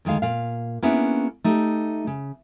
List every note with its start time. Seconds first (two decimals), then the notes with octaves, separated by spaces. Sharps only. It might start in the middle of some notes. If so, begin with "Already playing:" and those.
0.05 D2 D#3 G#3 F5
0.22 A#2 F5
0.82 A#3 B3 C#4 D4 E4 G#4
1.44 A3 D#4 G4
2.07 C#3